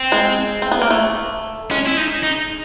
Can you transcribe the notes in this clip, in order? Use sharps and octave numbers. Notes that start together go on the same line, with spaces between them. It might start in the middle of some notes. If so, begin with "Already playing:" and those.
Already playing: C4
G#3
C4
B3
A#3
A3
G#3 C#4
E4
D#4
D#4